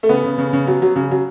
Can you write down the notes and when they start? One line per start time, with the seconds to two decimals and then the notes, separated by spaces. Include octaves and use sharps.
0.03 A3
0.09 C#3 B3
0.24 C#3
0.38 C#3
0.53 C#3
0.67 F#3
0.82 F#3
0.96 C#3
1.11 F#3